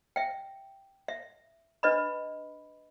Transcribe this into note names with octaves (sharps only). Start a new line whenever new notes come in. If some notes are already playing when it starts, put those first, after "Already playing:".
E5 G5
E5
D4 B4 D#5 B5